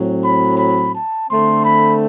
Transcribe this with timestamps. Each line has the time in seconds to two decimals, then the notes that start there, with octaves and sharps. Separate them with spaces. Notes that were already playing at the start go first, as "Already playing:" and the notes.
Already playing: A2 F#3 C4
0.23 B5
0.58 B5
0.94 A5
1.29 D3 A3 C4 C6
1.65 B5